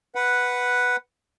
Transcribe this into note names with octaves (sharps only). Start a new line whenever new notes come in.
B4 F#5